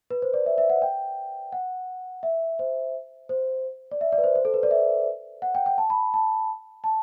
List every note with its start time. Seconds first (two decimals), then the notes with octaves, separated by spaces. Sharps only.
0.11 B4
0.22 C5
0.34 D5
0.46 E5
0.58 E5
0.70 F#5
0.82 G5
1.52 F#5
2.23 E5
2.59 C5
3.29 C5
3.91 D5
4.01 E5
4.12 D5
4.18 B4
4.24 C5
4.35 C5
4.45 A4
4.54 B4
4.63 D5
4.71 E5
5.42 F#5
5.55 G5
5.66 G5
5.78 A5
5.90 B5
6.14 A5
6.84 A5